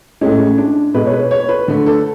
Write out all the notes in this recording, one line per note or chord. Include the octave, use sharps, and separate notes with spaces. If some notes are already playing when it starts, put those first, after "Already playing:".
A2 G#3 C#4
D4
B2 G#3 B4
C#5
B4
C#5
B4
D3 A3
A4